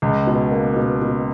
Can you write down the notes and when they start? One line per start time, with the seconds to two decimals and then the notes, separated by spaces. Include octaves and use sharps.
0.02 C#2
0.27 B2
0.51 A#3
0.76 B2
1.01 B2